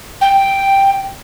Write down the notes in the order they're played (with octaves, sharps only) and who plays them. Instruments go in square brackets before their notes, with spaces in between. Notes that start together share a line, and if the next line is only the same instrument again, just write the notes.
[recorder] G5